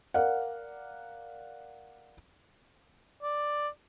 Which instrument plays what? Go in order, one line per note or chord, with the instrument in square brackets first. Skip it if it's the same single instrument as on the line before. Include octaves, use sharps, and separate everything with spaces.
[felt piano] A#4 D5 F5 F#5
[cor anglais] D5